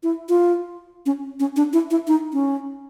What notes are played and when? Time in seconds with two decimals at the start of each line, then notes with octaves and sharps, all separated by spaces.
0.03 E4
0.29 F4
1.06 C#4
1.40 C#4
1.56 D4
1.73 E4
1.91 E4
2.07 D#4
2.33 C#4